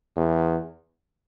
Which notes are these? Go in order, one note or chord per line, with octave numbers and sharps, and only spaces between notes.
E2